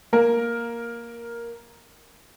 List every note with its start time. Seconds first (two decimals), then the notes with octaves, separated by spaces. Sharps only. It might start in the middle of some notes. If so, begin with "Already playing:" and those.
0.13 A#3 A#4